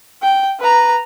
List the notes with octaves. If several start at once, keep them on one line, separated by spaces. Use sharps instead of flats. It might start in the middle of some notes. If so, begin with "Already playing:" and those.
G5
B4 A#5